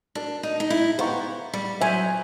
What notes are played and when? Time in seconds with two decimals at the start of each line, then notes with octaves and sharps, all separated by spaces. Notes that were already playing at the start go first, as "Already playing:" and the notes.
0.15 D4 F#4 A#4 D5
0.43 D#4
0.60 D#4
0.70 E4
0.98 B3 G4 C5 F5 A#5 C#6
1.54 G3
1.81 F#3 C5 E5 G#5